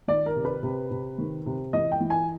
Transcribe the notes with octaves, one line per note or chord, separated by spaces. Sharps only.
D#3 D5
A#4
C3
B4
C3
C3
D#3
C3
E3 D#5
G5
E3
G#5